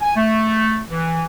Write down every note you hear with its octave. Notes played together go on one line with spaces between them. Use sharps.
G#5
A3
E3